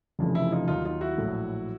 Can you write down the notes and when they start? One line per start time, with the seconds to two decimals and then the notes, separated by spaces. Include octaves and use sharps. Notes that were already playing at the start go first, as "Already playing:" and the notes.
0.19 F1 F2 C#3 E3
0.35 E4
0.52 D#4 F4
0.68 D#2 D#3 F#3 D#4 F4
0.85 D#4 F4
1.01 E4 F#4
1.18 A#1 A2 F#3